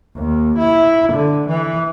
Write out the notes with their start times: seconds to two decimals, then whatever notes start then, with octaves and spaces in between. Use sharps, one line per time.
0.15 D#2
0.58 E4
1.13 D3
1.48 E3